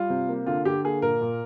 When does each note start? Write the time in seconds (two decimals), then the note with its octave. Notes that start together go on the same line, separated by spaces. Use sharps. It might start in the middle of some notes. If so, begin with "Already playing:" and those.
Already playing: G3 F4
0.10 C3
0.29 A#3
0.46 D3 F4
0.65 D3 G4
0.84 A#3 G#4
1.02 A#2 A#4
1.21 A#2